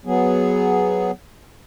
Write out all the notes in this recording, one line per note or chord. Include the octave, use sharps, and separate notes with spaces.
F#3 B3 G#4